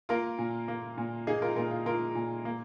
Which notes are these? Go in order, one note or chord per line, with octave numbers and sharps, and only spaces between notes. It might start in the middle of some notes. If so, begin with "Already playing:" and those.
A#3 F4 A#4
A#2
A#3
A#2
A#3 D#4 G#4
F4 A#4
A#2 F4 A#4
F4
A#3 F4 A#4
A#2
A#3